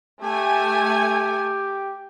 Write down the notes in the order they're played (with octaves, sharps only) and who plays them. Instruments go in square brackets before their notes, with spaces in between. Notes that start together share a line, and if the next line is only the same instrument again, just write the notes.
[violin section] A3 G#5 [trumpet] G4